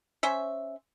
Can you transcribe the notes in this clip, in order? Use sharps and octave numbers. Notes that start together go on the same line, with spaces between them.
C#4 C5 E5